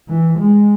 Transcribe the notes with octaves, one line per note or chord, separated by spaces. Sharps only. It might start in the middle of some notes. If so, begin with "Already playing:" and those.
E3
G#3